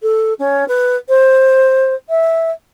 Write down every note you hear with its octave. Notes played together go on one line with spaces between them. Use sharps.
A4
C#4
B4
C5
E5